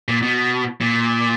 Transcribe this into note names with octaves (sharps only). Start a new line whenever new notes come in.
A#2
B2
A#2